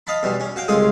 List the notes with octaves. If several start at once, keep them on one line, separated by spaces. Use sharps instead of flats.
D#5 F5 A5 B5
E2 B2 G3
C#4
F#4 F5 G5
C2 C#3 G#3 F4 G#4 D#6